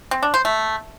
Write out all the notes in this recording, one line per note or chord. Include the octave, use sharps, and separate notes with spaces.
C4
D4
C5
A3